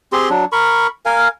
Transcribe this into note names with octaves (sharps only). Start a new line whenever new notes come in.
C4 G4 G#4 C6
F#3 D4
A#4 B5 C#6
A#4 F5 G#5